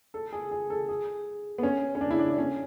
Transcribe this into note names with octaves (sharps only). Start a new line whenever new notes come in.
A4
G#4
G#4
A4
G#4
B3
C#4
C#4
D4
E4
D4
D4
C#4